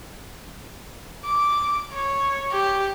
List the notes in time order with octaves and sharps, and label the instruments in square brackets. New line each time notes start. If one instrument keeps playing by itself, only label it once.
[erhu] D6
C#5
G4